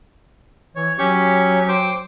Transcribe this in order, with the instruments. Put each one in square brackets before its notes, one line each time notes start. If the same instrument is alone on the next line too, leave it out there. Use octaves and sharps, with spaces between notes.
[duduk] E3 [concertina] C#5
[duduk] F#3 [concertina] C#4 G4 C#6
[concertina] C5 G5 D6